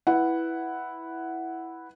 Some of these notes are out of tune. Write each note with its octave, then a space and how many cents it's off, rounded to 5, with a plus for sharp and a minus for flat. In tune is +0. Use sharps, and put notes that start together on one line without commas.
E4 +0 B4 +0 F#5 +5